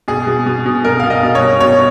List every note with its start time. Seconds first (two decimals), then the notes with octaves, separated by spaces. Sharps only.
0.08 B2 G#4
0.27 B2
0.46 B2
0.66 B2
0.85 B2 A#4
1.00 B2 F5
1.10 D#5
1.23 B2
1.35 C#5
1.42 B2
1.60 B2 C#5